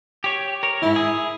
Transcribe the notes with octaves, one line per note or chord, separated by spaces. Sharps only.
G4 C#5
A#4 C#5
E2 G#2 E4
G#4